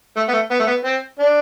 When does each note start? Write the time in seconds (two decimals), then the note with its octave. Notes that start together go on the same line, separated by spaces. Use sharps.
0.16 A3
0.29 B3
0.33 A3
0.51 B3
0.60 A3
0.67 B3
0.85 C4
1.19 D4